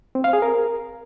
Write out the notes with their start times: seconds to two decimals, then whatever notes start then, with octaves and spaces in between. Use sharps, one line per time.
0.15 C4
0.24 F5
0.33 G#4
0.42 A#4